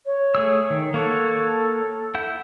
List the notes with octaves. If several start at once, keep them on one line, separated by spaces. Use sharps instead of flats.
C#5
A3 G#4 E6
D#3
A#3 A4 C#5 F#5
E4 F#5 G6